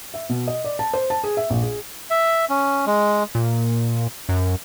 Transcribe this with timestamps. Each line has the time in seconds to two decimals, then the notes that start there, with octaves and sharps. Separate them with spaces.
0.14 E5
0.29 B2
0.47 D#5
0.64 D5
0.79 A5
0.93 C5
1.10 A5
1.24 G#4
1.37 E5
1.50 A#1
1.63 G#4
2.10 E5
2.50 C#4
2.87 G#3
3.35 A#2
4.29 F#2